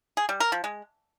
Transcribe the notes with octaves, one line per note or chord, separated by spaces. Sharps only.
G#4
G3
A#4
F3
G#3